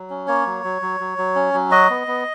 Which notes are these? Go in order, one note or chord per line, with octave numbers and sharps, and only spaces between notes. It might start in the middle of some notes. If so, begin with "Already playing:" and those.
Already playing: F#3
C#4
A#3 C#5
F#3
F#3
F#3
F#3
F#3
C#4
F#3
F#4 D#5
B3
B3